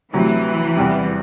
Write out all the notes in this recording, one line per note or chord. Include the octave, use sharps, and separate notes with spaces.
D2 C3 E3 F#3
E2 C3 G3